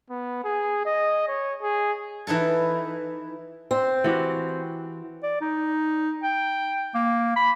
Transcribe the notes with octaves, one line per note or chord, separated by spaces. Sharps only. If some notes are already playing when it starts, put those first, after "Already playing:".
B3
G#4
D#5
C#5
G#4
E3 D#4 E4 A4
C4
E3 F#4 G4
D5
D#4
G5
A#3
B5